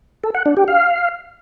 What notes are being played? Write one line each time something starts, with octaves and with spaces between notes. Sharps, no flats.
A4
F#5
D4
G4
F5